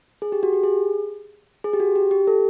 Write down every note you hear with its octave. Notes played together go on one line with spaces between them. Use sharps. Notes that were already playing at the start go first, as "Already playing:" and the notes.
G#4
G4
F#4
G4
G#4
G#4
G4
F#4
G4
G4
A4